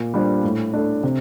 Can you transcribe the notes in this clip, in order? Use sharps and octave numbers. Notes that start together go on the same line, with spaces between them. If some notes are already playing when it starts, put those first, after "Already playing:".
Already playing: A#2
G3 D4 F4 C5
A2
A3 D4
C3